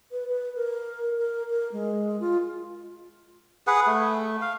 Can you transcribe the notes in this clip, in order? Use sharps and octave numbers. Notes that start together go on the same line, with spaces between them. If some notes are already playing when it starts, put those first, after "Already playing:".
B4
B4
A#4
A#4
A#4
G#3
F4
G#4 B4 F#5
A3
F5